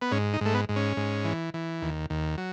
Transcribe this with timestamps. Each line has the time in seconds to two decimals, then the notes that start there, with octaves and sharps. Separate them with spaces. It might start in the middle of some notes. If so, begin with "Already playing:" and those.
0.02 B3
0.12 G#2 C#4
0.33 D#4
0.41 G#2 A3
0.54 B3
0.69 G#2
0.76 C#4
0.97 G#2
1.25 E3
1.54 E3
1.82 D#2
2.10 D#2
2.38 F#3